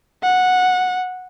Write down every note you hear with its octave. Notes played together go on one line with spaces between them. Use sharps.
F#5